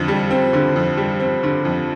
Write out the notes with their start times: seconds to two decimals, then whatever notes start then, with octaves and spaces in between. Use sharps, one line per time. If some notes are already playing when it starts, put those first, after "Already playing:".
Already playing: F2 D3
0.08 G3
0.30 C4
0.53 D3
0.76 F2
0.97 G3
1.20 C4
1.43 D3
1.65 F2